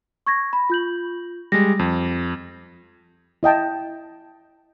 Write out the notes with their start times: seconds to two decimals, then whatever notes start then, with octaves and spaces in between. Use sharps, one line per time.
0.26 C#6 G#6 A#6
0.53 B5
0.70 F4 G6 F#7
1.52 G3 G#3 A#6
1.79 F2
3.43 E4 D#5 G5 A5